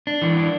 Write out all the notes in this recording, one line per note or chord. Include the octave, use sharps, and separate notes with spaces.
D4
E3
D4